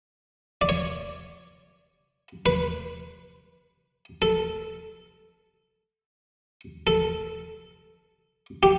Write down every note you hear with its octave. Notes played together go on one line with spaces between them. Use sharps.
D5
C#5
B4
A4
A4
G4